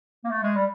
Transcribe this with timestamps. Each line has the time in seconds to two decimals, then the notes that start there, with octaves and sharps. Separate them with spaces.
0.24 A#3
0.30 A3
0.43 G#3
0.56 G3